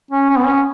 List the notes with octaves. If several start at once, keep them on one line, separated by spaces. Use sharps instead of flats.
C#4
C#4
B3
C#4